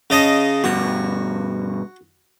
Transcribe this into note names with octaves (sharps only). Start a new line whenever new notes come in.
C#3 D#5 A5
G2 B2 F#4